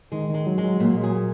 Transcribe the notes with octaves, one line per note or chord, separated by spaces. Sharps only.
D#3 G#3
D#3
G#3
F#3
F#3 G#3
A#2 F#3
G#3
F#3 G#4